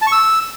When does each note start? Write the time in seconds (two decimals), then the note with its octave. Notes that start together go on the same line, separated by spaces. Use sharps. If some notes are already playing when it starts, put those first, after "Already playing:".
0.02 A5
0.07 C#6
0.12 E6